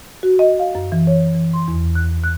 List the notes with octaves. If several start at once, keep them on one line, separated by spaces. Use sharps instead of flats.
F#4
D#5
F5
F#2
E3
C#5
E3
C6
E2
F#6
F#6